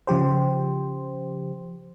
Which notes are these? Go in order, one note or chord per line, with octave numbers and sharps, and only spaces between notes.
C#3 F3 G4 C5